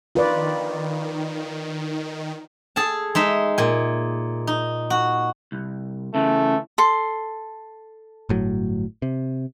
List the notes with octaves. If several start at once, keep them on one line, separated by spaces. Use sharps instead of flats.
D#3 F4 B4 D5
G#4 A4 A5
G#3 D#4 E5
A#2 G#5
D#4
F#4
C2
C#3 E3 A3
A4 C6
G1 A2 F#3
C3